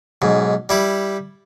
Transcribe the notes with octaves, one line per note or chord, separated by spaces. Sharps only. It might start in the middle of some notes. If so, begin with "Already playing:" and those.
B1 G#2
G3 E4 G4